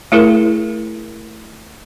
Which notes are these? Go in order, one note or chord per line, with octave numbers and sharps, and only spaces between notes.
A3 E4 G#4 A#4